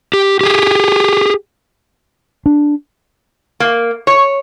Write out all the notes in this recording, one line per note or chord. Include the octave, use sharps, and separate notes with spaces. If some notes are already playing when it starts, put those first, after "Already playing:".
G4
G4 G#4
D4
A#3
C#5